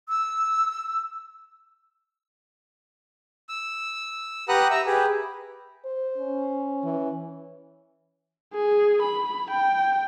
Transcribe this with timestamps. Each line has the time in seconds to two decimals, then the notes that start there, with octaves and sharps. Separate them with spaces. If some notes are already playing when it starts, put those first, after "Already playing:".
0.08 E6
3.49 E6
4.49 G4 B4 F#5 A#5 D#6 F#6
4.71 E5 A#5 E6
4.86 G4 G#4 B4
5.85 C5
6.18 C#4
6.84 E3
8.54 G#4
9.02 B5
9.51 G5